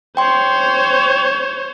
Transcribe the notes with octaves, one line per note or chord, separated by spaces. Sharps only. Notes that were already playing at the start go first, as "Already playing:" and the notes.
C5 C#5 G5 C6